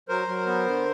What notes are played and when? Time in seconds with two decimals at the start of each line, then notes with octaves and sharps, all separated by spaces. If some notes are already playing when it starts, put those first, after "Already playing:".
0.09 F#3 A#4 C5
0.28 F#3
0.47 B3
0.66 D3